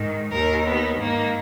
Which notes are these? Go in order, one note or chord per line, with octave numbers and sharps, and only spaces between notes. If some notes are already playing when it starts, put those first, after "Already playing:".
Already playing: G#2 D#3
D#2 D#3 A#4
B3
G#2 D#3 A#3